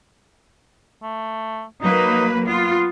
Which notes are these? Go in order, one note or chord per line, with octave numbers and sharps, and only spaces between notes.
A3
F#3 A#3 D#4 B4
B3 F4